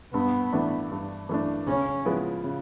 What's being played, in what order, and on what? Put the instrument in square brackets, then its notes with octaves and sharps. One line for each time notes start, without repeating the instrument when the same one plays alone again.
[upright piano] G2 [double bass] B3
[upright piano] E3 A3 D4
G2
E3 A3 D4
[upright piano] C#3 [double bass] C#4
[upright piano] F3 G#3 B3 E4
C#3